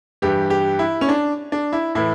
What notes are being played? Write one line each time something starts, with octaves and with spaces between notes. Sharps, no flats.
G2 E3 G4
G4
E4
C#4
D4
D4
E4
A2 E3 E4